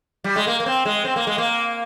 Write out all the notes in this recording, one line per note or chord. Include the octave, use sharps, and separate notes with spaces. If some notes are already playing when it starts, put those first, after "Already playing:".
G3
G#3
A#3
A#3
C4
G#3
C4
A#3
G#3
A#3